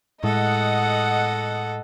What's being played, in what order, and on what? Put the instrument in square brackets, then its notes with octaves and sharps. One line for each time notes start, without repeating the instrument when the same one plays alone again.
[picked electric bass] A2 G#3 [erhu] A4 [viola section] D#5 F#5